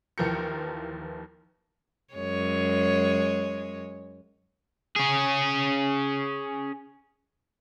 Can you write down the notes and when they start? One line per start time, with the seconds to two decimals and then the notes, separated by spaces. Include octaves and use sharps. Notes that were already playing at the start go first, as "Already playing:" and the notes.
0.18 D#2 E3 F3 A#4 G6 C#7
2.14 F#2 G#3 C#5
4.96 C#4 G#4